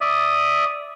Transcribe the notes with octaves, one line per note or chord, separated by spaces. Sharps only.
D5 E5 D#6